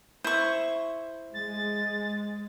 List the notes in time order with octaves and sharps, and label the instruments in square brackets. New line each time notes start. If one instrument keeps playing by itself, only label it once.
[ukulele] E4 [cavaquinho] C5 C#6
[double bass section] G#3 [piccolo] A6